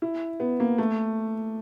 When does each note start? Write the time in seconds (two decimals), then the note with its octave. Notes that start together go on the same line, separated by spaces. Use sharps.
0.02 E4
0.40 B3
0.60 A#3
0.78 A3